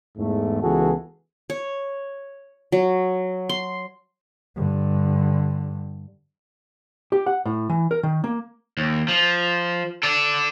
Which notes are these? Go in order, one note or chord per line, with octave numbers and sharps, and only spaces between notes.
E2 G#2 A3
C#2 E3 B3 F#4 G#4 A4
C#5
F#3
C6
G2 D3
G4
F#5
A2
E3
A#4
D#3
A#3
D#2
F3
A4 D5